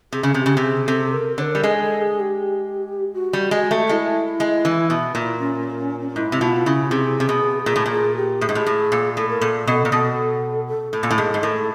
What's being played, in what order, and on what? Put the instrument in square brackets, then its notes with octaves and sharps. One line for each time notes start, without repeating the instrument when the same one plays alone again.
[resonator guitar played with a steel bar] C3 [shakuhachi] G#4
[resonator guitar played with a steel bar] C#3
[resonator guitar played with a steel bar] C3 [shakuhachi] G#4
[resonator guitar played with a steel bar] C#3 [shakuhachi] G4
[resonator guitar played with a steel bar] C3
[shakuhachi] G#4
[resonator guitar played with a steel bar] C3 [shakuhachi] A4
[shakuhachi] A#4
[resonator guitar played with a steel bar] D3 [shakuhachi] C#5
[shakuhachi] A#4
[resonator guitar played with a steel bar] G3
[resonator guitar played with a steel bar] G#3 [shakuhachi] A4
[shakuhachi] A4
G#4
G4
F#4
[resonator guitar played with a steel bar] G3
G#3
A3
[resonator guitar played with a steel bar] G#3 [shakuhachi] E4
[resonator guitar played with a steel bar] G#3
E3
B2
A#2
[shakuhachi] C#4
[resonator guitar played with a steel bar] G#2 [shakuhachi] E4
[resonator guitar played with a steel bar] C3
[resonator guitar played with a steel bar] B2 [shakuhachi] F4
[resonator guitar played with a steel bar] C#3 [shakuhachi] E4
[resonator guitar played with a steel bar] C3 [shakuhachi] G#4
[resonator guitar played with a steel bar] C3
B2
[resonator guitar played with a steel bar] A#2 [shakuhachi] G#4
[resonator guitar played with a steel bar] A2
A#2
[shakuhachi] G#4
G4
[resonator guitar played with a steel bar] A2 [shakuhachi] G#4
[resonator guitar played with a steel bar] G#2
A2
A2
A#2
[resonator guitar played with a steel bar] A2 [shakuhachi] A4
[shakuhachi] A#4
[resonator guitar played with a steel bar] A#2 [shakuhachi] A4
[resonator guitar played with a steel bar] B2
A#2
[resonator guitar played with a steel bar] B2 [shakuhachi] A4
[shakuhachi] A4
[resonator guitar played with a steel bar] A2 [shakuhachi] A4
[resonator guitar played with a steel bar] A#2
A2
[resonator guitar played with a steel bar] G#2 [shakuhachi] G#4
[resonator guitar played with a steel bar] G#2
[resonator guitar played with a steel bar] A2 [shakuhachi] A#4
[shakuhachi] A4